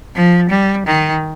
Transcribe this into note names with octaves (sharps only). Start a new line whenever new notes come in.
F3
G3
D#3